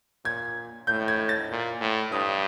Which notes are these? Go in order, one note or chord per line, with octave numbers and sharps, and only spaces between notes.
A#2 G#6
A2 G6
G#6
A6
A#2
A2
G2 D#6